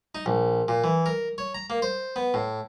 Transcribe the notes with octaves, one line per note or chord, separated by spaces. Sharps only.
D#4
A#1
A#2
E3
A#4
C#5
A#5
A#3
C5
B3
A2